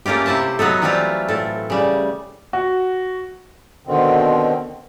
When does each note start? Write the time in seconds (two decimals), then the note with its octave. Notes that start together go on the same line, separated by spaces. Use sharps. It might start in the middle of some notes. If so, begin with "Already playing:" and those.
0.06 A3 A#3 C#4 F4 G4
0.26 C3 E4 C5 E5 A5
0.59 F#3 B3 D#4 A4
0.82 E3 F#3 G3 A3 C4 F4
1.28 A2 A4
1.70 C#3 G3
2.53 F#4
3.87 B2 D3 D#3 C4